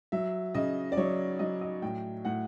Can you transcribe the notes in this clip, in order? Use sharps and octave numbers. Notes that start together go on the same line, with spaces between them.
F#3 E5
C#3 D#5
D5
F#3 C#5
F#3 D#5
D#5
A2 G5
A2 F#5